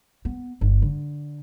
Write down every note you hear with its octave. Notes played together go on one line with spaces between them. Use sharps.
B3
G1
D3